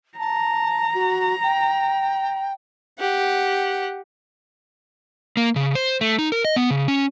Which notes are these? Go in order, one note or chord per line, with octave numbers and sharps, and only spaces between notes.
A5 A#5
F#4
G5
G4 F#5
A#3
C#3
C5
A3
D#4
A#4
D#5
B3
C#3
C#4